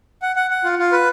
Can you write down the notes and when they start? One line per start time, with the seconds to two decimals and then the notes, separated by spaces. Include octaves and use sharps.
0.22 F#5
0.36 F#5
0.50 F#5
0.64 F4
0.79 F4
0.92 B4